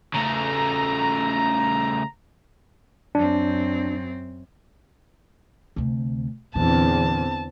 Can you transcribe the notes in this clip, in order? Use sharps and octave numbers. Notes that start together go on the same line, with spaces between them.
C#3 A3 A#5
F#2 C4 D4
D2 C3
E2 A#2 D3 E3 C4 A5